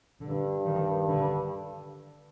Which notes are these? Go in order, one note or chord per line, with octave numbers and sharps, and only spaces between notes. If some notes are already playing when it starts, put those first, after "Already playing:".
G2 D3
D#3
D3